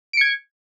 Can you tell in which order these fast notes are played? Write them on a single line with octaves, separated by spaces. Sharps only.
D7 C#7 G#6